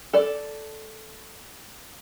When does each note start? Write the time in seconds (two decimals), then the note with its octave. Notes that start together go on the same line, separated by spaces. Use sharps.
0.13 A4 D5